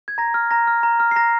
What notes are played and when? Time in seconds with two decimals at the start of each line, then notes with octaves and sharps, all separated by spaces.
0.08 G#6
0.18 A#5 A#6
0.34 F6
0.51 A#5 A#6
0.67 F6
0.83 A#5
1.00 F6
1.11 C7
1.16 A#5 A#6